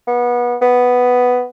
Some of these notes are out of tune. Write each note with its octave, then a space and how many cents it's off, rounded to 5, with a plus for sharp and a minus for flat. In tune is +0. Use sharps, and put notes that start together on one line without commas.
B3 -25
B3 +5